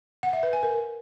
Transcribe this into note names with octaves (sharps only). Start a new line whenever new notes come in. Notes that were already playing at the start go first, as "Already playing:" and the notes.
F#5
E5
B4
G#5
A#4